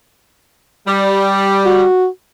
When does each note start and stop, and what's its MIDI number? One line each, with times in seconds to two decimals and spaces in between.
0.87 1.83 55
1.65 2.07 66